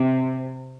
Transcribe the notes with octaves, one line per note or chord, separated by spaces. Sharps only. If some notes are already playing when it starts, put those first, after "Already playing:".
Already playing: C3